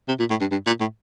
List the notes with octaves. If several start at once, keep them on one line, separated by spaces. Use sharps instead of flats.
C3
A#2
A2
G2
G2
A#2
A2